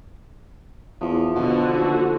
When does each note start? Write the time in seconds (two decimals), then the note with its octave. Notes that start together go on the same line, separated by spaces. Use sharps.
1.01 E2 F3
1.36 B2 D3 F#4
1.75 D#2